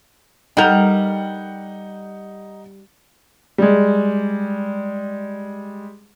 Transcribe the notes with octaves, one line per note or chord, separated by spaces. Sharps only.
G3 D#4 A#4 F#5 G6
G3 G#3